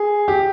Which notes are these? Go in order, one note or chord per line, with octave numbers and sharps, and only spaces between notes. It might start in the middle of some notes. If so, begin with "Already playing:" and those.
Already playing: G#4
G4